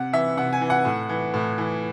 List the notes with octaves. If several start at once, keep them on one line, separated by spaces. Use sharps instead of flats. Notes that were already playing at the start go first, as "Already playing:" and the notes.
Already playing: C3 F#5
E3 E5
C3 F#5
G#5
E3
F#5
A2
E3
A2
E3